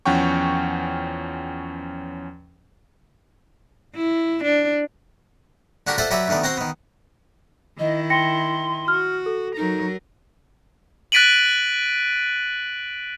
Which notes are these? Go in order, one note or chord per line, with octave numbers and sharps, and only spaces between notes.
E2 F3 C#4 F#5 G5 C#6
E4
D4
D3 D4 F#4 G4 A#4
F4 A4 C5 D5 E5 F#5
F#3 F#4 G4 B4 D5 E5
D2 D#3 A3 B3 D5
C4 F#4 A#5 C6
D#3 B3
D#3 E4 D#5
G5 C6 A#6 C#7
F#4 F6
A4
F#3 D#4 A#4
F#6 A6 B6 D7 D#7 F#7